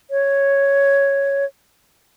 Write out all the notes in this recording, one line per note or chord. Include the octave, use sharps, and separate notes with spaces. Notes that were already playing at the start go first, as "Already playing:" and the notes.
C#5